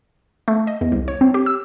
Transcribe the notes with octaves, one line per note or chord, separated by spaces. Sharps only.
A3
D#5
E2
C2
C#5
C4
G4
E6